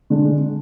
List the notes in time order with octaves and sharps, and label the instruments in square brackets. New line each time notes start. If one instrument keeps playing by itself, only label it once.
[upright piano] D3 G#3 D4